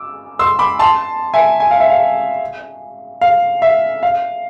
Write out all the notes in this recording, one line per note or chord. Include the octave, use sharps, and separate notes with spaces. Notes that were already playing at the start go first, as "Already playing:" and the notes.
Already playing: D6 E6
C6 E6
B5 D6
A5 C6
E5 G#5
G#5
F5
E5
F5
F5
E5
F5